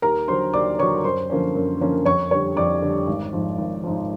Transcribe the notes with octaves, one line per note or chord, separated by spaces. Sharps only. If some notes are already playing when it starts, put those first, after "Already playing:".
D#2 A#4 A#5
D3 F#3 C5 C6
D#2 D5 D6
D3 F#3 C#5 C#6
F#2 C5 C6
D3 F3 A#3 C#4
F#2
D3 F3 A#3 C#4
F2 C#5 C#6
D3 G3 C#5 C#6
F2 D5 D6
D3 G3
G#1
G#2 F3
G#1
G#2 F3